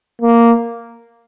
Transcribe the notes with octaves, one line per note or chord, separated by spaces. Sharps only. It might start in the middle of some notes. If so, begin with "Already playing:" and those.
A#3